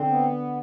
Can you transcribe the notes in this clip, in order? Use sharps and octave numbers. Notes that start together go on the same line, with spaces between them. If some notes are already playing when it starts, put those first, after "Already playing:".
Already playing: D3 C4
B3